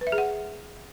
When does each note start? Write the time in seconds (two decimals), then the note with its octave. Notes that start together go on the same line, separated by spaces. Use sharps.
0.01 B4
0.07 E5
0.12 G#4
0.18 F#5